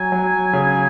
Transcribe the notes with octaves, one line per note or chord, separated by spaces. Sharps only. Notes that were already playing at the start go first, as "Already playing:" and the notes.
Already playing: F#3 G#5
F#3
C#3